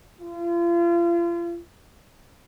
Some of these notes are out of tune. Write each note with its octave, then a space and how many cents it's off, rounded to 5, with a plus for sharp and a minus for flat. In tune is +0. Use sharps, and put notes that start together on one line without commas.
F4 -35